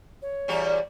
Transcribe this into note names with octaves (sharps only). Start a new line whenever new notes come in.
C#5
E2 G3 F#4